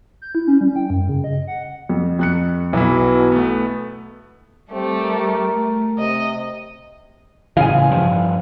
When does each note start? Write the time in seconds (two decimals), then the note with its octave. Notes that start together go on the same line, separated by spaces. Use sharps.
0.22 G6
0.35 E4
0.47 C#4
0.61 G3
0.76 G5
0.90 F#2
1.09 C#3
1.24 D#5
1.47 F#5
1.89 F2
2.19 F2 F#6 C#7
2.73 B1 B2 E3 E4
3.32 A3 B3
4.72 G3 A3 C4 G4
5.02 A#4
5.53 A3
5.99 C3 D#5
7.57 A2 C#3 E3 F5 G#5
7.91 G2 F3 G3